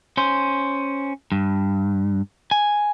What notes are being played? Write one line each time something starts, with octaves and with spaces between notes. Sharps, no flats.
C#4 C5
G2
G#5